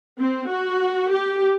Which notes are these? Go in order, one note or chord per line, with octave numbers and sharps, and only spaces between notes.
C4
F#4
G4